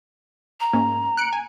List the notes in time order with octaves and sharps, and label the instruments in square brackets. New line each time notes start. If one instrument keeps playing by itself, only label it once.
[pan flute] A#5
[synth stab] G#2 A#3 C#4
F#6 C#7 D7
G#5